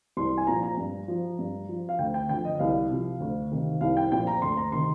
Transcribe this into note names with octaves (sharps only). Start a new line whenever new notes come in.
C2 C6
G#5
A#2 F3 A#5
A#5
G2
F3
G2
F3
F5
D2 G5
G5
D3 F3 G5
D#5
D#5
C2 F5
C3 F3
D2
C3 D#3
C2 F5
G5
A#2 F3 G5
A#5
D2 C6
A#5
C3 D#3 C6